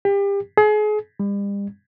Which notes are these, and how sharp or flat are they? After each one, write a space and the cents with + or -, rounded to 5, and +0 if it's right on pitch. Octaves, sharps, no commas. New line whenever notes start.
G4 +30
G#4 +35
G3 +40